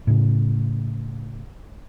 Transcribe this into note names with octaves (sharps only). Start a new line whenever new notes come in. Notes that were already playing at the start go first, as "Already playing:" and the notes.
A2 C#3